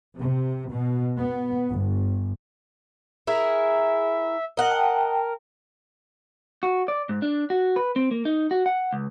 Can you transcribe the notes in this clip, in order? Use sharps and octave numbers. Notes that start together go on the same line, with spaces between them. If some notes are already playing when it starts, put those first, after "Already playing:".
C3
B2
B3
G1
E4 G#4 A#4 E5
A#4 D#5 F#5
G5 A5
F#4
D5
G#2
D4
F#4
B4
C4
A#3
D#4
F#4
F#5
C#2